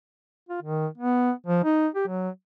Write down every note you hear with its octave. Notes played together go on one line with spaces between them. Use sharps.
F4
D#3
B3
F3
D#4
G4
F#3